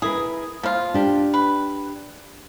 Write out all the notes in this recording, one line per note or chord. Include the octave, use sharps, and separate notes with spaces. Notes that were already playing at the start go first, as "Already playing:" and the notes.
E4 G#4 A#4 B4
F3 A#3 F4
D4 G4
B4